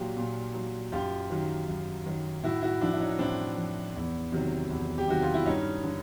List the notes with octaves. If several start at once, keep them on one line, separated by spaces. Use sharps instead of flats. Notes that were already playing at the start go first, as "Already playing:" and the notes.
Already playing: A#2 F#3 F4 G4
A#2
F#3
F#2 F4 G4
D#3 F#3
F#2
D#3 F#3
A2 E4 F#4
E4 F#4
F3 D4 E4
E4
C#4 D#4
D#4
A2 C4 D4
F3
E2
C3 D#3 F#3
E2
G4
C3 D#3 F#3 F#4
F4
E4
G2 C#4 D#4
D3